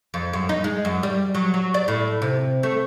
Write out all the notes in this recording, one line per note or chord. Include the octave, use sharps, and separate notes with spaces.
F2
F#2
D#4
G#3
F#2
G3
F#3
F#3
D5
A2
C3
A3